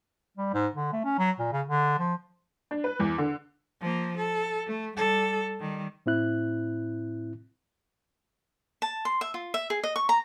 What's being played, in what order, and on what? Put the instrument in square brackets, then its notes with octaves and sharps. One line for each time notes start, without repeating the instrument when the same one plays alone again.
[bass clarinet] G3
G#2
D3
A3
C#4
F#3
A#2
C#3
D3
F3
[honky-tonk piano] D4
B4
E2
D3
[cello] F3 A#3
A4
A3
G3 A4
D#3 G3
[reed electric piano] A2 C4 E4 F#6
[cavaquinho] A5
C6
E5
F4
E5
G#4
D#5
C#6
A#5